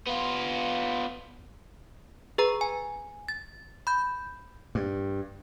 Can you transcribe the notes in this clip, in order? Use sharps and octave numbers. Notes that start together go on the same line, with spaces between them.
B3 F4
G#4 B4 A#5
G#5
A6
B5 G6
G2